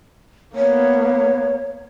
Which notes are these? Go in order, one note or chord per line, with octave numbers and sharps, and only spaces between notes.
A#3 B3 C#5